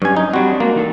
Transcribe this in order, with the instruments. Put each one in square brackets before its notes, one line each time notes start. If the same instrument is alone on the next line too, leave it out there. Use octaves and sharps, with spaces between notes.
[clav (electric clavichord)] G2 G#5 [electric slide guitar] F#3 C#4
[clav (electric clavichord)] D#4
[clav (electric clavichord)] G3 F#4 [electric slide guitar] C4 D4
[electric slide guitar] G#3 F#4 [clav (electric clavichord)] A#3
[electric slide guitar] E3 D#4 A4